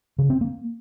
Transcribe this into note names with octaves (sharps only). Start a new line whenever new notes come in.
C#3
C4
A#3